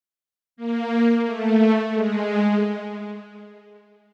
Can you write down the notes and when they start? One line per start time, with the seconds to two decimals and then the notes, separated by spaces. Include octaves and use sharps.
0.57 A#3
1.25 A3
1.94 G#3